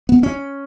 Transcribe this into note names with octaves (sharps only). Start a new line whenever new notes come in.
B3
C#4